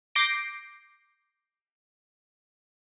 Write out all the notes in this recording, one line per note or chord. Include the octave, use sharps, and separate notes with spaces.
D6 G6 A#6 C7 D7